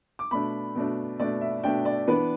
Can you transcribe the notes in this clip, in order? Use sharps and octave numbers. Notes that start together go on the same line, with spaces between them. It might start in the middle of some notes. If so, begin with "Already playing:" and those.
D6
B2 A3 D4 B5
B2 A3 D4
B2 A3 D4 D5
E5
B2 A3 D4 G5
D5
E3 B3 D4 B4